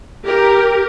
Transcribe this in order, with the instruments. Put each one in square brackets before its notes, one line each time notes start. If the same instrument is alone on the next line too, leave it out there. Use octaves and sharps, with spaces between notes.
[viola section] G4 A#4